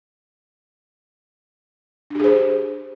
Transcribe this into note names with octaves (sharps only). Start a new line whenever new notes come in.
D4 G4 G#4 C5